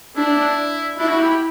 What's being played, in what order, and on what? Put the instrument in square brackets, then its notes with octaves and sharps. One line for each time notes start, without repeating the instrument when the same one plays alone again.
[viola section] D4 [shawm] E4
[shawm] D4 [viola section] E4
[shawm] F#4
G4
G4